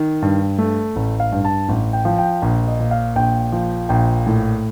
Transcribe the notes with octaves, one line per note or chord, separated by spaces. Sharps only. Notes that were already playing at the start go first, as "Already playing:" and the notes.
Already playing: D#3
G2
A3
A1
F5
G2
A5
A1
G5
F3
G5
A#1 F5
D#5
A#2
F5
A#1 G5
F3
A#1 G5
A2